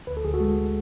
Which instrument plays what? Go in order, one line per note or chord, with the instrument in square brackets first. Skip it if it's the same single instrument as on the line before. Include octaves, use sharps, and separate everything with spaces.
[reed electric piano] D2 B4
A4
D2 G#4
F#4 A4
G#3